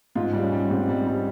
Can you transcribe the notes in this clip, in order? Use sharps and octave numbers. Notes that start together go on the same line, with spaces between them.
G#2 F4
G3
C#4
G3
G#2 C4
G3 C4
G3